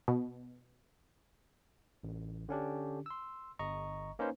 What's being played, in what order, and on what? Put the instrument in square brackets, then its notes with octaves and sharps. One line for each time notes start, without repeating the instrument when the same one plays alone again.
[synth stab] B2
[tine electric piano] A1
D3 C#4 D4 G4
C6 E6
G1 D#5 A#5 C#6
A#3 C#4 D#4 B4 C5